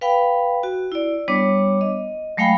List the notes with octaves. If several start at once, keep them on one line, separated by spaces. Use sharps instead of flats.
B4 F5 G5 B5
F#4
E4 D5
G3 B3 D4 C#5 D6
D#5
F#3 G#3 A3 F5 G5 B5